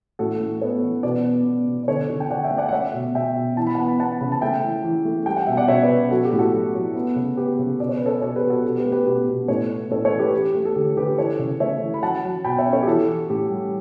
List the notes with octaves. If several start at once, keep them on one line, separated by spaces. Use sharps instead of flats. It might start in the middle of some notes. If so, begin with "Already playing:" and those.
A2 F#4 A4
A2
B3 A4 C#5
E3
B2 B4 D5
B3
B3
B2
D5
D3 A4 C#5
D3
G5
D3 D5 F#5
E5 G5
A3
D5 F#5
F#5
A3 C#5 E5
B2
B2 E5 G5
B2
E3 A5
B5
B3 F#5 A5
B3 F#5 A5
C#3 B5
A5
A3 E5 G5
E3
E3
A3
G3 G5
F#5
B2 E5
D5 F#5
B2 C#5 E5
B4 D5
B2
F#3 F#4 A4
G4
A2
F#4 A4
F#3
F#3
B3
C#3
B3 G4 B4
C#3
B2 D5
C#5
B4
C#4
A4 C#5
B2 A4 C#5
G4 B4
B2
F#4 A4
B2 F#4
G4 B4
A3
G4 B4
B2 G4 B4
B2
A2 A4 C#5
B3
A2 A4 C#5
A4 C#5
E3
G4 B4
C#4 G4
A3
A4
D3 G4
D3 G4 B4
E3 A4 C#5
C#3
A3 C#5 E5
E3
B5
F#3 F#5 A5
F#3
B2 G5 B5
C#5 E5
C#4
A4 C#5
G4
E3 F#4 A4
E3
A2 G4
G3